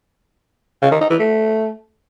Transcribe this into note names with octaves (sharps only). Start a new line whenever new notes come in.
C#3
D#3
D#4
E3
A3